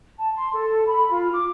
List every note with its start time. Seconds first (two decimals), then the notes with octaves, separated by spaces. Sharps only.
0.18 A5
0.35 C6
0.54 A4
0.87 B5
1.11 F4
1.32 D6